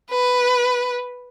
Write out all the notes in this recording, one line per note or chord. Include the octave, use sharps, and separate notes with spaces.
B4